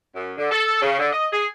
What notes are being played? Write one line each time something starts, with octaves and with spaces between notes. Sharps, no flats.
F#2
D3
A4
C#3
D3
D#5
G#4